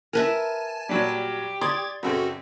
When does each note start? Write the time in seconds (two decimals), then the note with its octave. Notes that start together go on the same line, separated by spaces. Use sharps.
0.13 A#4 B4 E5 G#5 A5
0.89 A#2 F#3 G3 G4
1.61 D5 C6 D#6 G#6 A6
2.03 F#2 C#3 C4 F#4 A4